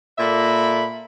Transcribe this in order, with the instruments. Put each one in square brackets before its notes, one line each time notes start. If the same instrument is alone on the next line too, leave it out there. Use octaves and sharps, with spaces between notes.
[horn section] A#2 A#3 A4 E5 B5